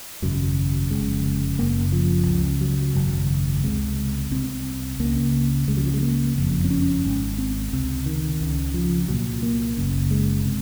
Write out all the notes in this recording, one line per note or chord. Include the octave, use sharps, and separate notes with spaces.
G#1 F#2 C#3 F#3
F1 D#2 C#3 G#3
F#1 F#2 C#3 A#3
F3
C#2 C#3
F#3
G#1 F#2 C#3 F#3
C#2 C3 G#3
C2 C3 C4
C#2 C#3 A#3
C#2 C#3 G#3
F#3
F3
G#3
A#3
F#1 F2 C#3
C4
C#4
G#1 G#2
C4
C#2 C3
D#3
C#2 C#3
F3
C2 A#2 F#3
A#3
F#1 F#2 C#3
G#3
C3